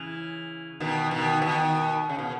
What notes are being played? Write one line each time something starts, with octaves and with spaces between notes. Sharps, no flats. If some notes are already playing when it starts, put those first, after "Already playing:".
Already playing: C#3 E3
B2 D#3
B2 D#3
B2 D#3
C#3
B2